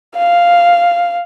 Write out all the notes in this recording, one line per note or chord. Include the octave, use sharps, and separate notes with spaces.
F5